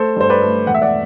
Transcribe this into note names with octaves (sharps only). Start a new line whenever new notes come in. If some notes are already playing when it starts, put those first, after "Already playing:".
Already playing: A3 A4 C5
G2 C5
B4 D5
A3
E1 F#5
E5
D5 F#5